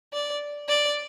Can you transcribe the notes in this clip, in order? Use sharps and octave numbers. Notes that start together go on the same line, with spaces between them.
D5
D5